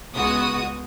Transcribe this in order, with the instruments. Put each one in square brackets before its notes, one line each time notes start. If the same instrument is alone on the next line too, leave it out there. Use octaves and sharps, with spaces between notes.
[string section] C#2 G#3 B3 F#4 D#6